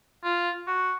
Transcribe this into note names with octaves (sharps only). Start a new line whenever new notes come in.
F4
F#4